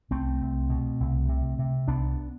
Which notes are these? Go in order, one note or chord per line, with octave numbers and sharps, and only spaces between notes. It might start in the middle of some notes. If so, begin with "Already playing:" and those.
C2 A3 C4
C2
B2
C2
C3
C3
C2 B3 D4